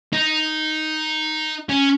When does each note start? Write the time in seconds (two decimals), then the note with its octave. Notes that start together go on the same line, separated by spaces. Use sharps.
0.13 D#4
1.69 C#4